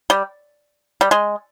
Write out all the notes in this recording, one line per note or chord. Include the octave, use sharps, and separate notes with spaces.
G3
G3
G#3